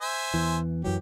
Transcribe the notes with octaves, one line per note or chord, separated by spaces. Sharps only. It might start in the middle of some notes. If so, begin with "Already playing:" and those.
C5 E5 G#5
E2 E3
F#2 E3 F#3 G4